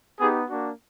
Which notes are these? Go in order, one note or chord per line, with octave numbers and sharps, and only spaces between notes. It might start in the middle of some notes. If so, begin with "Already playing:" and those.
B3 D#4 G4 G#4
A#3 D4 F#4